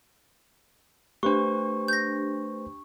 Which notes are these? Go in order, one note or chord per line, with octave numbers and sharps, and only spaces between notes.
A3 D4 G4 B4 C5 C#6
G6 A#6